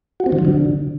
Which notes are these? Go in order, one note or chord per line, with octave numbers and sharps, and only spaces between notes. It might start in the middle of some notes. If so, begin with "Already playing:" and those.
F#4
C4
D#3
F#3
D3